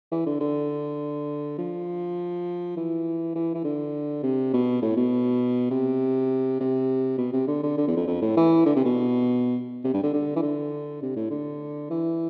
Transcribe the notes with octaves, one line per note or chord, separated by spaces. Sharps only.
E3
D3
D3
F3
E3
E3
E3
D3
C3
B2
A2
B2
C3
C3
B2
C3
D3
D3
D3
E2
F2
F2
A2
E3
D3
C3
B2
C3
G2
D3
D3
E3
D3
C3
A2
D3
E3